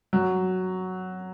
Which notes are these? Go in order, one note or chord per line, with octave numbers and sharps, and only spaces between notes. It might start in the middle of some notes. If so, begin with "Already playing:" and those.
F#3